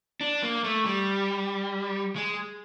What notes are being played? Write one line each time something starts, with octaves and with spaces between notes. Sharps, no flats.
D4
A#3
A3
G3
G#3